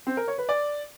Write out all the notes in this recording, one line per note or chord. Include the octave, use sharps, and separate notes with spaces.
C4
A#4
C#5
B4
D5